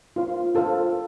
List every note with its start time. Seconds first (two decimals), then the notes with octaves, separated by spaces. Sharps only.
0.16 F4 C5 F5 C6
0.55 F4 A4 C5 F5